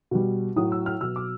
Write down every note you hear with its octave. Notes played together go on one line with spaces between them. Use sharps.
B2 G3
A2 F#3 D#6
E6
F6
B2 F#3 E6
D6